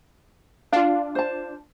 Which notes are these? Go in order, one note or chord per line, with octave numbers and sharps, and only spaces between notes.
D4 F4 F5
C5 A5